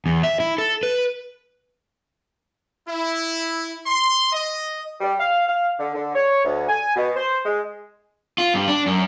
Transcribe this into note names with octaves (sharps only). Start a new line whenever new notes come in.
E2
E5
E4
A4
B4
E4
C6
D#5
G3
F5
F5
D3
D3
C#5
D2
G#5
B2
C5
G#3
F4
G2
D4
F#2